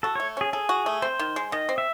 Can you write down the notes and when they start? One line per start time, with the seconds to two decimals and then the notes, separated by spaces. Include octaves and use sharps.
0.03 F#4 A4
0.15 A3 C#5
0.37 C#4 G#4
0.53 G#4 A4
0.69 F#4
0.86 A3
1.02 C4 C5
1.19 D#3
1.36 G#3
1.52 D#3 D#5
1.69 C4
1.78 E5